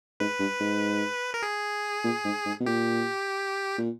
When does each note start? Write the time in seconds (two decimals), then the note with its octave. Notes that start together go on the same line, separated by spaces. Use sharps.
0.20 G#2 B4
0.40 G2
0.60 G#2
1.34 A#4
1.42 G#4
2.04 A#2
2.24 G#2
2.46 G#2
2.60 B2
2.66 A#2 G4
3.78 A#2